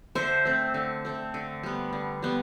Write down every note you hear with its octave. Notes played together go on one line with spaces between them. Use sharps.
D3 C5 E5
A3 C4
D3
A3 C4
D3
G3 B3
D3
G3 B3